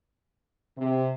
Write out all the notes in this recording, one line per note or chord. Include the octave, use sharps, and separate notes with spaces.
C3